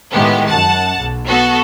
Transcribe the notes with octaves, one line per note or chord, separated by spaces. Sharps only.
A2 D#3 G#3 B3 G4
F#2 F#5 A5
B1
B3 F#4 A4